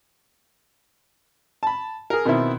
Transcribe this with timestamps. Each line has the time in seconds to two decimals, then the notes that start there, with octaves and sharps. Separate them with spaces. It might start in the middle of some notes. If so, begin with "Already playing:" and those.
1.63 A5 B5
2.10 G#4 A#4
2.25 B2 D#3 B3 C4 E4